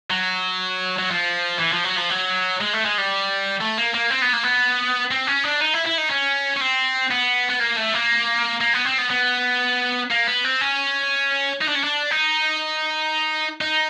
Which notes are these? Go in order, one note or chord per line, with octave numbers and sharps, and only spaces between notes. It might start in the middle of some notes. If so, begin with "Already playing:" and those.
F#3
F#3
F3
E3
F3
F#3
F3
F#3
G#3
A3
G#3
G3
A3
A#3
A#3
C4
B3
A#3
B3
C4
C#4
D4
D#4
E4
E4
D#4
C#4
C#4
C4
B3
B3
A#3
A3
A#3
A#3
B3
C4
B3
B3
A#3
B3
C4
C#4
D#4
D4
C#4
D4
D#4
D#4